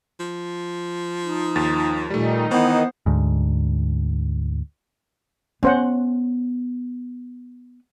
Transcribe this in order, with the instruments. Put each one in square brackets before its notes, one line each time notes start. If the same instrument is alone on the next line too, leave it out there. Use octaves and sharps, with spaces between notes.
[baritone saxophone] F3
[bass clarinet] D#4
[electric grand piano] D#2 A6
[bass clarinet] A#2 [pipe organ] D#3 D#4 [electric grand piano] G3 A3
[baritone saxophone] E3 [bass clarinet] B3 [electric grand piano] C5
[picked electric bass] D2 G#2
[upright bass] B3 [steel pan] C#4 C5 F#5